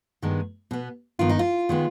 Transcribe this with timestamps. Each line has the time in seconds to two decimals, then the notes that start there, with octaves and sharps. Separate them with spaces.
0.22 G2 D#3 G#3 B3
0.71 B2 B3
1.19 G2 D#3 B3 F4
1.29 D#4
1.39 F4
1.69 D#3 G#3 B3